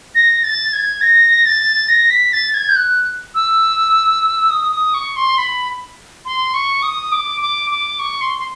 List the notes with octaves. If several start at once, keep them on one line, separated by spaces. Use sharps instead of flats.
A#6
A6
G#6
A#6
A6
A#6
B6
A6
G#6
G6
F#6
E6
D#6
D#6
C#6
C6
B5
C6
C#6
D#6
D6
D6
D6
C#6
C6
C6